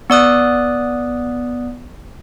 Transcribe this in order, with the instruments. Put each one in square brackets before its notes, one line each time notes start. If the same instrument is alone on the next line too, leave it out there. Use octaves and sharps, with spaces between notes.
[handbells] B3 D5 D#6 F#6